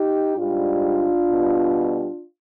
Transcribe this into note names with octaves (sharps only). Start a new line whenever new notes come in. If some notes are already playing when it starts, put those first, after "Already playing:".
Already playing: D#4 G4
G#2 G3 D4 F4
B2 G3